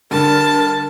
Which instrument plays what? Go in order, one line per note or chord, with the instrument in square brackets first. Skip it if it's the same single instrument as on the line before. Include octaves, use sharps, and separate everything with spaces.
[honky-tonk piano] G2 D3 [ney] A#4 [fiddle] A5